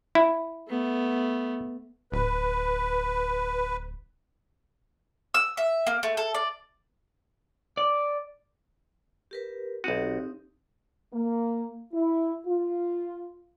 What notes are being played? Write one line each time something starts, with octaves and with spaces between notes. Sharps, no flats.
E4
A3 B3
D1 B4
E6
E5
A#3
A3
A4
D5
D5
G4 A#4 B4
B1 C4 D#4 F#4 G4
A#3
E4
F4